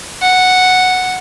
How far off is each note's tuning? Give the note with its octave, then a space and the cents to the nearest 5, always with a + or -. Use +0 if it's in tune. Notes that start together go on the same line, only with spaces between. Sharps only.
F#5 -5